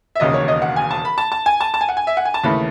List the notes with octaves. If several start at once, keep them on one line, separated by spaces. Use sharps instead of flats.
E5
E1 D#2 C#3 D#5
C#5
D#5
F#5
G#5
A5
B5
A5
A5
G#5
A5
A5
G#5
F#5
G#5
E5
F#5
G#5
A5
D#2 C#3 E3 A3 B5